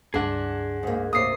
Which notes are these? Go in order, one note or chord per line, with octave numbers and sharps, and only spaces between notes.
C#2 G2 D4 G#4 F#5
G#2 A#3
C3 A#3 D#6 C7